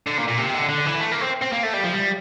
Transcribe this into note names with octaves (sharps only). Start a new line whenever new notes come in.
D3
A#2
A#2
C3
D3
D3
E3
A3
A#3
C4
C4
A#3
A3
G3
F3
G3